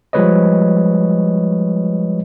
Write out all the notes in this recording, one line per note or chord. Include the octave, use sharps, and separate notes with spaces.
F3 G3 G#3 B4 C#5 D#5